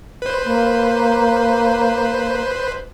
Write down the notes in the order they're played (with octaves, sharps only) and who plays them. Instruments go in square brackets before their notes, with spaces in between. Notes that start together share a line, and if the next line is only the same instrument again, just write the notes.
[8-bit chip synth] B4 C5
[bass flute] A#3